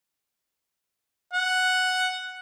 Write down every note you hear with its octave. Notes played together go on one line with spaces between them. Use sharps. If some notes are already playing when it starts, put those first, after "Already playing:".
F#5